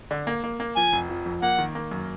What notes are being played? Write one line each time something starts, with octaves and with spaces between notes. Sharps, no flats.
D3
A#3
A#3
A#3
F3 G#5
F1
F3
F2
A#3 F#5
D#3
A#3
F#2